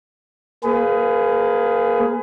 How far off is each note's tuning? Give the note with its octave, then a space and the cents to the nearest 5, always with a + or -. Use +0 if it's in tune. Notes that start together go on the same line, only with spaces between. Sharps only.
A#3 +0 G#4 +5 B4 +35